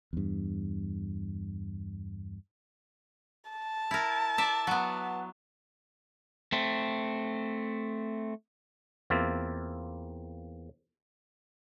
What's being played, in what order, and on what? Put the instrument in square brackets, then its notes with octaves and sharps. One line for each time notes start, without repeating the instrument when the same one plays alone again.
[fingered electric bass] E2 G2
[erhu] A5
[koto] E4 A#4
D5 E5
F#3 B3
[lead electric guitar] A3 C4
[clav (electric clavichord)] E2 A#3 C4 F4 E5